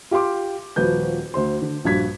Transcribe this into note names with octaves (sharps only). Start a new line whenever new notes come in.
F4 G4 F5 C6 D6
D#1 F3 F#4 B4 G6
D2 C5 C6
D3
A#1 G2 F#4 G#6 B6